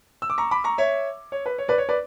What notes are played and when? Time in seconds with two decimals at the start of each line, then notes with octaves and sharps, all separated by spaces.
0.22 E6
0.30 D6
0.38 A#5 C#6
0.51 B5 D6
0.64 A#5 C#6
0.78 C#5 E5
1.32 C#5
1.46 B4
1.58 C#5
1.68 B4 D5
1.78 C#5
1.89 B4 D5